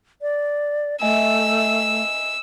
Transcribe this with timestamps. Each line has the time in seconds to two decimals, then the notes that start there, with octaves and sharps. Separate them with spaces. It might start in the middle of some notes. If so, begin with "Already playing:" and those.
0.22 D5
1.02 A3 D#5 E5 G#5 E6